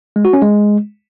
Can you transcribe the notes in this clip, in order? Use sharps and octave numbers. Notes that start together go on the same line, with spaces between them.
G#3
F#4
C#4
G#3